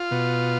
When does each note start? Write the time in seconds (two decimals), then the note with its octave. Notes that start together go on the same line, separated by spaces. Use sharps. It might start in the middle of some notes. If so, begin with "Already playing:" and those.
Already playing: F4
0.11 B2